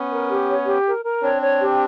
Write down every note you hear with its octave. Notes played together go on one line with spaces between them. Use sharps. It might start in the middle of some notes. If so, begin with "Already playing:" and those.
Already playing: B3 C#4
A#4
G4
C#5
G4
A#4
A#4
C4 D4 C#5
C#5
G4